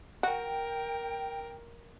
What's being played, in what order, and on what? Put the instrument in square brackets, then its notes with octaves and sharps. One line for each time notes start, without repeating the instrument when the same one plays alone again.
[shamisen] F#4 [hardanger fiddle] A#4 [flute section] G5